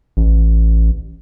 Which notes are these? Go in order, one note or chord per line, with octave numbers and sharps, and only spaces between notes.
A1